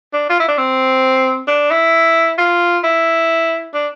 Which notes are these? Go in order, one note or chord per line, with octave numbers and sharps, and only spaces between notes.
D4
F4
E4
D4
C4
D4
E4
F4
E4
D4